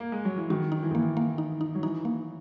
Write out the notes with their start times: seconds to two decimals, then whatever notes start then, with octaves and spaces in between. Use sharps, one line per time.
0.00 A#3
0.12 G#3
0.25 F#3
0.37 E3
0.50 D#3 F#4
0.72 D#4
0.83 E3
0.91 D#3
0.95 E3 A#3
1.17 A#3
1.38 D#4
1.61 D#4
1.75 F#3
1.83 E3 D#4
2.05 A#3